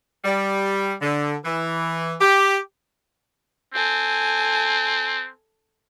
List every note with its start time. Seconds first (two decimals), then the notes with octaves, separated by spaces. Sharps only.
0.25 G3
1.02 D3
1.45 E3
2.21 G4
3.74 C4 A4 G#5